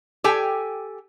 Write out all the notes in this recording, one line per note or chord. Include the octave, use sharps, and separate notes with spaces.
G4 A4 G5 G#5